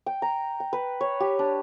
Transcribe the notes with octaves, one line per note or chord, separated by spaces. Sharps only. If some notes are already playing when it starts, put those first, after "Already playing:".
G5
A#5
G5
B4
C#5
G4
D4